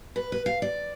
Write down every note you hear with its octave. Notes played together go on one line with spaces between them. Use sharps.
B4
B4
F5
D5